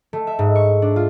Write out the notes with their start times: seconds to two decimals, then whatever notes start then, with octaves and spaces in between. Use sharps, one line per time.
0.13 A3
0.27 E5
0.39 G#2
0.56 C#6
0.82 D4
0.96 F4